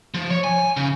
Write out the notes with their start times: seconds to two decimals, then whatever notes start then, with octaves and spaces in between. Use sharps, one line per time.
0.14 F3
0.30 C#5
0.44 G#5
0.77 C#3